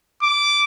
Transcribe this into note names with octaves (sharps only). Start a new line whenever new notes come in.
D6